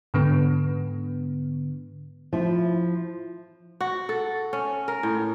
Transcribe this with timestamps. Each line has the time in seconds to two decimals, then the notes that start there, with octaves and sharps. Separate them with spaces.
0.14 G#2 D3 B3
2.33 F3 E4
3.81 F#4
4.09 A4
4.53 C#4
4.88 A#4
5.03 A2